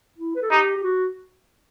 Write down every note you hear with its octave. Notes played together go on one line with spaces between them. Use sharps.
E4
B4
A4
D#4 G4
G4
F#4